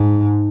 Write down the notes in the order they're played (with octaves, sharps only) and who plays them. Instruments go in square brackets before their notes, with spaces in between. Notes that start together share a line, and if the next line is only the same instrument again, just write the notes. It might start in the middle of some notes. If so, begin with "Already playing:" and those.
Already playing: [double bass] G#2 [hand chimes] D#4